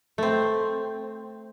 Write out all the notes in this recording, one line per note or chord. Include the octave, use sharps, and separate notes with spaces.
A3 C4